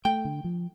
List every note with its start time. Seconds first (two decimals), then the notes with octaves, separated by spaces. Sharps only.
0.05 A3 G5
0.25 D3
0.44 F3